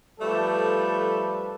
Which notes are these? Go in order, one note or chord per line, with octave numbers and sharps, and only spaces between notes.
F3 G3 A3 A4 B4